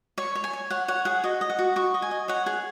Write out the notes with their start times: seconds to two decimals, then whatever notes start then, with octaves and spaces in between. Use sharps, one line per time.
0.18 C#5 C#6
0.35 C#5
0.44 G#5
0.53 C#5
0.70 C#5 F#5
0.88 C#5 F#5
1.05 G#4 F#5
1.24 F#4 D#5
1.41 D#5
1.50 F#5
1.59 F#4
1.76 F#4 C#6
1.94 D#5
2.02 G#5
2.11 D#5
2.28 C#5 F#5
2.46 G#4 F#5